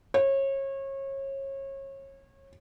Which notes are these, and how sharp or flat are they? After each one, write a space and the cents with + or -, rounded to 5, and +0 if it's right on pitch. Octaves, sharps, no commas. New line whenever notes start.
C#5 -30